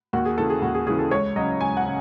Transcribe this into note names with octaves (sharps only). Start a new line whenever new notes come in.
D#2 F#4
G#4
C#3 E3 A4
G#4
D#2 F#4
G#4
C#3 E3 G#4
A4
C#2 C#5
C#3 F#3 D#5
C#2 G#5
F#5
C#3